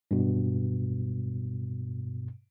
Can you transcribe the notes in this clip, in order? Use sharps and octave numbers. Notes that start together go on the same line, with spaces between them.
G2 B2